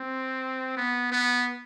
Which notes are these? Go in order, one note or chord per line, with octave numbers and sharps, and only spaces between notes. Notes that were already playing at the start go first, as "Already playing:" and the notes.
Already playing: C4
B3
B3